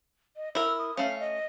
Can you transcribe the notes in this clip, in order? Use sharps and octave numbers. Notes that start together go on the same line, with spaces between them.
D#5
E4 A#4 E6
D#6
A3 C#4 F5
D#5